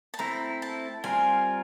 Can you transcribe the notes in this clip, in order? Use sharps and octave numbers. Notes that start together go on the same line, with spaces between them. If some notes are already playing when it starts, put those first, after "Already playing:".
A5
A3 C4 E4 A#5
A5
G3 C4 F4 A#4 G#5